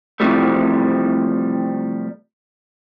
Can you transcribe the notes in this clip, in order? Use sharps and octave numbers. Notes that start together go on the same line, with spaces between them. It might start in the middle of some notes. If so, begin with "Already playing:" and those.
C3 E3 F3 G3 A3